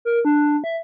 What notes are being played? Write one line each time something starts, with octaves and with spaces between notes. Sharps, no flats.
A#4
D4
E5